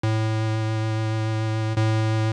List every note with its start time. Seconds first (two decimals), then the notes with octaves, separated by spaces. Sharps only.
0.03 A2
1.77 A2